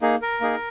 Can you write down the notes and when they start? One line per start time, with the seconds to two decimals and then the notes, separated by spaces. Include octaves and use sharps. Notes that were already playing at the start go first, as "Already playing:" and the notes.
0.02 A#3 D#4 G#4
0.22 A#4
0.41 A#3 D#4 G#4